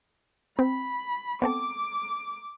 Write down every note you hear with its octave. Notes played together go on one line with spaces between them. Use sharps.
C4 B5
B3 C4 A4 D6